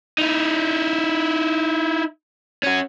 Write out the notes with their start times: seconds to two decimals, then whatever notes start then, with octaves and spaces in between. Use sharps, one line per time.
0.18 D#4 E4
2.63 C#4 F#4